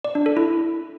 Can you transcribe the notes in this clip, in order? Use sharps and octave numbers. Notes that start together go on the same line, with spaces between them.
D5
D4
A4
E4